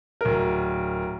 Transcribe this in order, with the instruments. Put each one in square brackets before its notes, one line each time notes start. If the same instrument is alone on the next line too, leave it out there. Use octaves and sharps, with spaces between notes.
[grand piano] D1 A#4